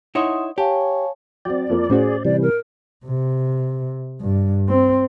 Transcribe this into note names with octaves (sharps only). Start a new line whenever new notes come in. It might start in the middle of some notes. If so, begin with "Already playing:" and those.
D#4 E4 C#5 F#5 C6 D#6
G4 C#5 F5 G#5 A5
F#3 C4 D5 G5
F2 F3 A#3
A2 C#4 F#4 G#4 C5
C3 E3 G3 D5
A#4
C3
G2
C4